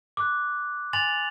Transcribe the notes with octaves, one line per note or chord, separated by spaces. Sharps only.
D6 F#6
G#5 C6 A6 F7 F#7